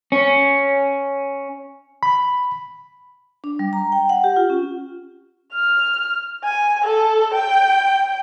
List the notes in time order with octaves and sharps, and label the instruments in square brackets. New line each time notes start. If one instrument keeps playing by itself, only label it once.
[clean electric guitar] C#4
[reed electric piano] B5
[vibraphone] D4
G3
A#5
G5
F#5
G4
F4
C#4
[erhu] F6
G#5
A4
G5